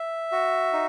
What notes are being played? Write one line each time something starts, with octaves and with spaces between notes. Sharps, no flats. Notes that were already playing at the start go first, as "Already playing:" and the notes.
Already playing: E5
F#4
D#4